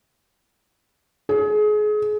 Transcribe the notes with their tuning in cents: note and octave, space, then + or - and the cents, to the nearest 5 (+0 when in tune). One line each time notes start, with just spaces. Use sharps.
G#4 +30